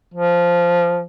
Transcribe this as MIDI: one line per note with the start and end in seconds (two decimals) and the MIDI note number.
0.14 1.04 53